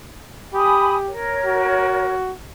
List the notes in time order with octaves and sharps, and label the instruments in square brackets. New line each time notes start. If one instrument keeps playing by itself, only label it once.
[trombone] G4 [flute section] G#5 B5 D#6
[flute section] A#4 C#5
[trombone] F#4